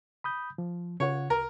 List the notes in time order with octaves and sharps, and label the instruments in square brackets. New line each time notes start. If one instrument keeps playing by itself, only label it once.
[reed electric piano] B5 D#6 G6
F3
[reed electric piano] C#3 F4 F#5 [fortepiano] C#5
[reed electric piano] C2 [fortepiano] A#4